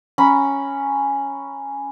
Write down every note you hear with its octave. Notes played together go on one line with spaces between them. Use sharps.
C#4 A#5 B5